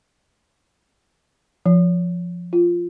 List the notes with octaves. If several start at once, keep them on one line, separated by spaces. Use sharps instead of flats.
F3
F4